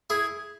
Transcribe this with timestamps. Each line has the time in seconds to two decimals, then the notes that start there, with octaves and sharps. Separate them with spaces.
0.10 E4 G#4